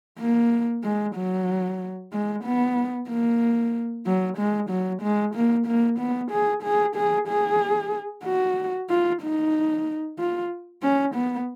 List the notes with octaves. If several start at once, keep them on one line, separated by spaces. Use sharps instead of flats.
A#3
G#3
F#3
G#3
B3
A#3
F#3
G#3
F#3
G#3
A#3
A#3
B3
G#4
G#4
G#4
G#4
F#4
F4
D#4
F4
C#4
B3